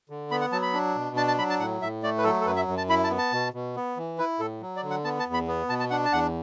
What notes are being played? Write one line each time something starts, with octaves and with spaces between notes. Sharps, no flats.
D3
B3 B5
F#5
F#3 A5
B5
D4
B2
D4 A5
A5
F#3 B5
A5
A2 F#5
A2 E5
A3 D5
B4
F#3 A4
A4
F#2 B4
E5
F#2
A5
E4 B5
A5
B3
A5
B2
B2
B3
E3
E4 B4
A2 A4
F#3
D5
D3
F#5
B3 A5
A5
E2
B5
B3
B2 A5
A5
D4 F#5
A5
E2 F#5